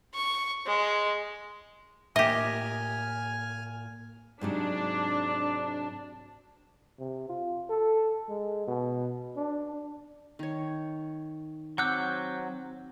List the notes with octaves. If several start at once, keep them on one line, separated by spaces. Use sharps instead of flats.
C#6
G#3
A2 A#3 G4 D#5 E5 G#5 F6
G#2 C3 F#3 D4
C3
F4
A4
G#3
B2
D4
D#3 C#5
F#3 C4 F#5 D6 E6 F#6 G6